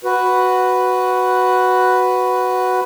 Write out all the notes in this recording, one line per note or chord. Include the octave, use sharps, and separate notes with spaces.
F#4 B4